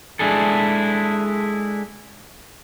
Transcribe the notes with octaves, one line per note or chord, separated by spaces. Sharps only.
G#3 D4 E4 G#4 A4